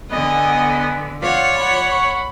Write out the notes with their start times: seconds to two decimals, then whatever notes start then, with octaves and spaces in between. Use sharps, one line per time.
0.11 D3 B3 D#5 G#5
1.22 F4 C#5 D5 F5 F#5
1.58 F#5 B5
1.91 C#6